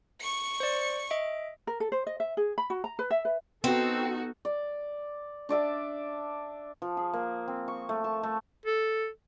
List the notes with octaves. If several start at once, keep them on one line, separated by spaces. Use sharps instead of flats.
C#6 C#7
C5 D5
D#5 E5 D7
A#4
A4
C5
D#5
E5
G#4
B5
F#4
A#5
B4
E5
B4
B3 C4 D#4 F#4 A4
D5
D4 D5 E5 A5
F3
G#4
A#3
C4
C#6
A3
A5
A3
A4